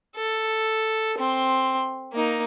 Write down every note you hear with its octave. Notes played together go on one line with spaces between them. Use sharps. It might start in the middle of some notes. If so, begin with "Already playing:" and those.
A4
C4 C6
A#3 D#4